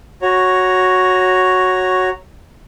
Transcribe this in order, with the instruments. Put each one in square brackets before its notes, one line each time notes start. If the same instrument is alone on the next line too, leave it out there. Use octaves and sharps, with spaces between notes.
[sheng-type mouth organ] F#4 C#5 A#5